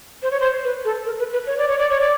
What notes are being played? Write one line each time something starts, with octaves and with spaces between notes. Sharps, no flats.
C5
C#5
C5
B4
A4
A#4
B4
B4
C#5
D5
C#5
D5
C#5
D5